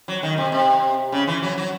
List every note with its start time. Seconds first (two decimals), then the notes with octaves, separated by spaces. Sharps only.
0.08 F#3
0.23 D#3
0.38 C3
0.52 C3
1.12 C#3
1.27 E3
1.43 F#3
1.58 F#3